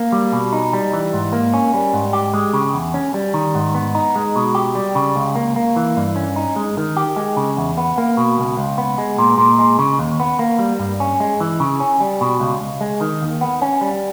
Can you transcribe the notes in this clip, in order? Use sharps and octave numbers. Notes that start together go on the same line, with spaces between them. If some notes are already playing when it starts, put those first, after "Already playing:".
Already playing: A#3
G3
B2
D#4
G3
E3
G#2
A#3
C#4
G3
G#2
G4
G#3
C#3
E2
C#4
G3
D#3
G#2
B3
D#4
G#3
B2
G4
G3
C#3
C#2
A#3
A#3
E3
G2
C#4
D#4
G#3
D#3
G4
G#3
C#3
E2
B3
A#3
B2
C#2
C#2
B3
G#3
A#2
A#2
G#3
C#3
D#2
B3
A#3
G3
G2
C#4
G#3
E3
C#3
C#4
G3
B2
C#2
C#2
G#3
D#3
D#2
B3
C#4
G3